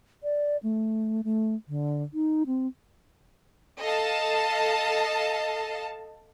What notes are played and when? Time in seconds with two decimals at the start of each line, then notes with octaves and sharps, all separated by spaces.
0.23 D5
0.63 A3
1.24 A3
1.68 D3
2.14 D#4
2.47 C4
3.80 A4 D#5 F5 A5